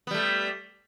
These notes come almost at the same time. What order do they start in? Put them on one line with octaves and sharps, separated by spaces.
B3 G3 A3